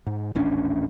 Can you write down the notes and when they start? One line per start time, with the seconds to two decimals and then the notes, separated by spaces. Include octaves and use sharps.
0.07 G#2
0.35 D#1 A1 C#4 D4